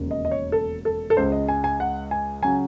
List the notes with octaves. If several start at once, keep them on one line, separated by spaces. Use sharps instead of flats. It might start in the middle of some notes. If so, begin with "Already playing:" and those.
Already playing: E1 D#2 C#3
D#5
D#5
C#5
A4
A4
A4
C#2 C#3 G#3 C5
D#5
G#5
G#5
F#5
G#5
C#3 F#3 G#5